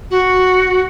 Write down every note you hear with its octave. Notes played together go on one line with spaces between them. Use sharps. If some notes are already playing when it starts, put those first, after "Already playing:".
F#4